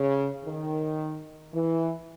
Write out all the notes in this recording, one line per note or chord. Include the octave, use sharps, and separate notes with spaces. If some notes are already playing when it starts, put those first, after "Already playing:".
Already playing: C#3
D#3
E3